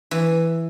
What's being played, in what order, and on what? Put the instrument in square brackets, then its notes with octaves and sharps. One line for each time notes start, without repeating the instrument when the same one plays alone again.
[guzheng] E3